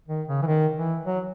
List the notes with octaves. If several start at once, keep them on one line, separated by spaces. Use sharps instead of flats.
D#3
C#3
E3
D#3
E3
F#3